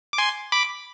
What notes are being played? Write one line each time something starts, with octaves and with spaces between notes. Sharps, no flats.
D6
G#5 C6
B5 D6